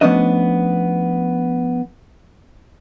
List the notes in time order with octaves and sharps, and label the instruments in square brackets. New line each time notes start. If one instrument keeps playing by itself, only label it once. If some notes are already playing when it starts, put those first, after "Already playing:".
[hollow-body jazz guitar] F3 A3 B3 C#4 D4 D#5